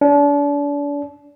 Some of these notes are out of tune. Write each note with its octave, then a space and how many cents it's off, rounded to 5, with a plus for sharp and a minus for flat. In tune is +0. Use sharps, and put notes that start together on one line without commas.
D4 -35